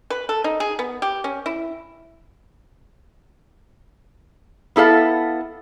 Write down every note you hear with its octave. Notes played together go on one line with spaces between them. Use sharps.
B4
A4
D#4
G#4
B3
G4
C#4
E4
B3 E4 A4 F5